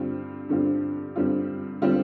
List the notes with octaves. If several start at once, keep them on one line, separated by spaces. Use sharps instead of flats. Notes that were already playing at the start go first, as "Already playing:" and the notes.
Already playing: G2 D3 G3 C4 F4
G2 D3 G3 C4 F4
G2 D3 G3 C4 F4
D3 G3 C4 F4